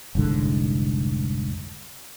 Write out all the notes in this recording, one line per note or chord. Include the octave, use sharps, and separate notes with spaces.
F1 C2 G#2 D3